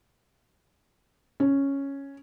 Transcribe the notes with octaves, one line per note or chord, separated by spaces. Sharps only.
C#4